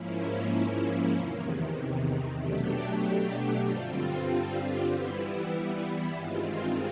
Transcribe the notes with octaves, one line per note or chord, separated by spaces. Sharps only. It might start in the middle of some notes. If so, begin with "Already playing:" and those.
Already playing: G#2 F3 A#3 C#4 E4
E2 C3 D#3
B2 F#3 A3 D4 G4
G2 D3 G3 C4 F4
E3 G3 B3 E4
G2 D#3 G#3 C4 F4